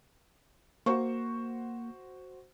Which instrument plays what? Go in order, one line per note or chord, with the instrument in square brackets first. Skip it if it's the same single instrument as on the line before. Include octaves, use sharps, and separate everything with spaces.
[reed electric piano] A#3 [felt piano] F#4 C5 C#6